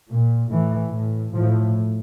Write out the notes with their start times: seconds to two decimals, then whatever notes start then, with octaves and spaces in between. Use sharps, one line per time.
0.10 A#2
0.51 A2 E3
0.93 A2
1.34 A2 F3